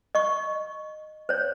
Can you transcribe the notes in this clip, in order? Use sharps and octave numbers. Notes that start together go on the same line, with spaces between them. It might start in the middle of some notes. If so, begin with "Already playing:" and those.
D#5 C#6
C5 C#5